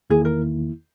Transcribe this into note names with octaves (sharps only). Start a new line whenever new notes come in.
E2 D#3 A#3 E4 G#4
A#4